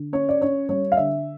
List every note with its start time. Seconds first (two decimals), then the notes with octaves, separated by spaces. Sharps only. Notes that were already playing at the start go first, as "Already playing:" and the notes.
Already playing: D3
0.13 C#4 C#5
0.29 D5
0.41 C#4 C#5
0.69 G3 C#5
0.92 F5
0.97 D3 E5